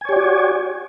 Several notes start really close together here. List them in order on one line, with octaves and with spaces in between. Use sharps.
G#5 C#5 G4 D5 F#4